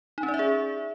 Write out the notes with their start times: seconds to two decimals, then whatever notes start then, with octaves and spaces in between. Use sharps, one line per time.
0.18 D#4
0.23 C#4
0.28 D5
0.34 E5
0.39 G#4